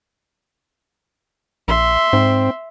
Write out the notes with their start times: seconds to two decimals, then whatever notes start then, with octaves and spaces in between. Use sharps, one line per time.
1.68 A#1 E5 C6
2.13 G#2 C4